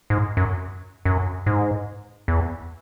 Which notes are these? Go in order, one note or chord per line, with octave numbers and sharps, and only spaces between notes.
G#2
F#2
F#2
G#2
E2